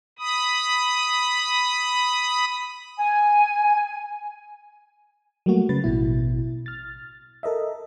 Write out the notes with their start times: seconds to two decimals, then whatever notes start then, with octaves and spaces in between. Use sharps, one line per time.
0.19 B5 D#6
2.97 G#5
5.46 F#3 G3 A3 A#3 F#4
5.69 C#3 B4 A6
5.84 A1 B2 E4
6.66 F6 A6
7.43 A4 A#4 D#5 E5